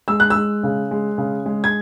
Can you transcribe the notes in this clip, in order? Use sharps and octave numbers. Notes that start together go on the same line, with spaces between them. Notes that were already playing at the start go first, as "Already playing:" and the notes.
G#3 E6
F#6
E6
G#3
C#3
G#3
C#3
G#3
G#6